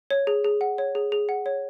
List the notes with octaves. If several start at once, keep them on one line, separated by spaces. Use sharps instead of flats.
C#5
G#4
G#4
F#5
C#5
G#4
G#4
F#5
C#5